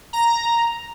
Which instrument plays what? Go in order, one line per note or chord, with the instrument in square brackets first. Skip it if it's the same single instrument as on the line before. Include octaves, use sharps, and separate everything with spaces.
[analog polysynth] A#5